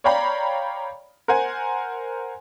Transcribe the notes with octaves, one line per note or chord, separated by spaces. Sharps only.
C#5 D5 F5 G5 A#5 B5
A#4 C5 F#5 G#5